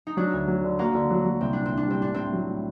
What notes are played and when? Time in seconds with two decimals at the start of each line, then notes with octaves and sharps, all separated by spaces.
0.07 D#4
0.17 F#3 D4
0.33 D2
0.48 F#3
0.64 D3
0.79 A#3 F#4
0.95 D3
1.11 F#3
1.25 F#3
1.41 C2 C4
1.53 A#2 D4
1.65 C4
1.72 C2
1.77 D4
1.87 G3 C4
2.02 A2 D4
2.14 A2 C4
2.33 F#3
2.49 A2